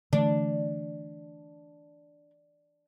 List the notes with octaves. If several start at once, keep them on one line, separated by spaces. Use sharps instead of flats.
D3 E3 A3 D4